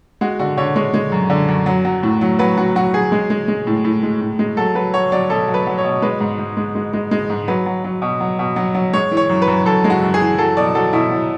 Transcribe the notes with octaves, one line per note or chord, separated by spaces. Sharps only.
G#3 F#4
D3 F#4
D3 C#5
G#3 C#5
G#3
F#2
D3
F#2
F#3
F#3
A2
F#3
F#3 B4
F#3 F#4
F#3 F#4
F#3 G#4
G#3
G#3
G#3
A2
A2
G#3
A2
G#3
F#3 A4
F#3 B4
F#3 C#5
F#3 D5
B2 A4
F#3
B4
F#3
C#5
B2
G#3 B4
G#2
G#2
G#3
G#3
G#3
G#3
G#2
F#3 B4
F#3
F#3
B2
F#3
B2
F#3
F#3
G#3 C#5
E3
C#5
F#2
B4
F#2
F#2 A4
G#3
F#4
F#2
G#4
E3
F#3 A4
B2 D5
F#3 A4
B2 E4
F#3